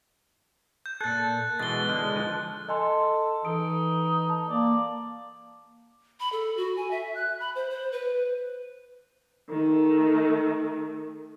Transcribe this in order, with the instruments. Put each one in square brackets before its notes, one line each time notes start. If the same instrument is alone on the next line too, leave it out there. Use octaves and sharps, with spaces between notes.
[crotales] G6
[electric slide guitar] A#2 A4 [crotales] F#6 A6
[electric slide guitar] B2 E3 G#3 [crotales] A6 G7
[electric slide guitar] D3 G#3 [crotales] F6
[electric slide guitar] E3 F3
[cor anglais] A4 [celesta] D#5 G#5 C6
[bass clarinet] E3 [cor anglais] D#4 [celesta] A4 D7
[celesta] A5
[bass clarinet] A#3 [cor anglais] D5
[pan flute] B5
A4
F#4
G#5
E5
F#6
B5
C5
C5
B4
[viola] D#3 A3